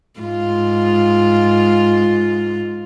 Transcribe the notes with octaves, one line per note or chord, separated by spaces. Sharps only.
G#2 F4